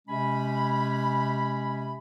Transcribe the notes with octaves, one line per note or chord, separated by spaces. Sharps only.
C3 G#3 C#4 G#5 B5